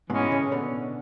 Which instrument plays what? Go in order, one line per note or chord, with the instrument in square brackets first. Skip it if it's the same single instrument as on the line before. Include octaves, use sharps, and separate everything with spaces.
[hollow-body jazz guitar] G#2 B2 [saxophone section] E3 G#3 C#4
[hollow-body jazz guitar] A2 C#3
B2 D3